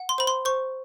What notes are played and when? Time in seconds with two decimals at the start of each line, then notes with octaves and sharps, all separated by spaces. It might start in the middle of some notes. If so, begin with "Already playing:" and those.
Already playing: F#5
0.09 C6
0.18 C5 B5
0.27 C6
0.45 C5 C#6